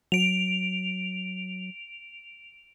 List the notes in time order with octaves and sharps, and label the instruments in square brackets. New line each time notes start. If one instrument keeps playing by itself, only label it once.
[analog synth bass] F#3 [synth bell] D7 F7